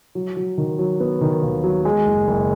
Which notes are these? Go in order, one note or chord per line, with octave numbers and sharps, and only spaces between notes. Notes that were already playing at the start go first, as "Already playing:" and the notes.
F#3
F#3
D#3
F#3
B3
D#3
D#2
F#3
G#3
F#1
F#1